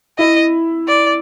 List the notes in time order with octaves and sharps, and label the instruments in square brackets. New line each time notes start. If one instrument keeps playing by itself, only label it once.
[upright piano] E4 [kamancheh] D#5
[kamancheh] D5